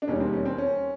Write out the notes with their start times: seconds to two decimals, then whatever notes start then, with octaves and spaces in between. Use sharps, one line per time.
0.02 D4
0.07 E1 D#2 D#3 G3 C#4
0.20 C4
0.33 C#4
0.45 C4
0.58 C#4